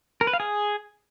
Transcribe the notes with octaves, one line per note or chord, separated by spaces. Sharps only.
A#4
B4
F5
G#4